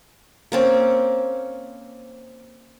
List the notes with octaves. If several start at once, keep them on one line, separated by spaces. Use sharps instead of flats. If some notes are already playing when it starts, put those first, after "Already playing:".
A#3 C4 C#4